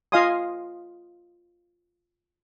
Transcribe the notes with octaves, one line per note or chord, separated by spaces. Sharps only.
F4 D#5 F5 G#5 C6 D#6